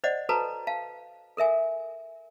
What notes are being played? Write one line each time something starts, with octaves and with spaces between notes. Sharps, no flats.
C5 D5 D#5 F#5
F#4 A4 B4 C5 A5 A#5
F5 A5
A4 A#4 E5 G#5